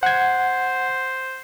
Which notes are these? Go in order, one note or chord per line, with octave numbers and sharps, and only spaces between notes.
C5 F#5 G#6